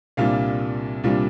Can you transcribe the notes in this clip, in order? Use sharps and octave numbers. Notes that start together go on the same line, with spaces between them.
C2 A#2 G3 D4 F4 F5
C2 A#2 G3 D4 F4